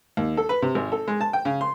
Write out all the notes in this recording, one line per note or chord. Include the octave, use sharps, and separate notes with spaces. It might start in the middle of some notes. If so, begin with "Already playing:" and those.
D#2
A4
B4
C3
G#1
A4
G#3
A5
G5
C#3
C6